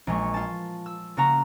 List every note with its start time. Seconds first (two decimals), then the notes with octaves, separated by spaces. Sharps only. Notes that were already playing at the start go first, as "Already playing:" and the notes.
0.07 A#1 G#3 C#6
0.34 F4 A5
0.86 E6
1.17 C#3 A#3 F#4 A#5